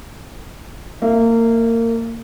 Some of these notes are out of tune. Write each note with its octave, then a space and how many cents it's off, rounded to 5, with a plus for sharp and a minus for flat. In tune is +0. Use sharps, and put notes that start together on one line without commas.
A#3 -25 E5 -5